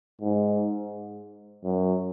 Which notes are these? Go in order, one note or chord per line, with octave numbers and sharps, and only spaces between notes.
G#2
F#2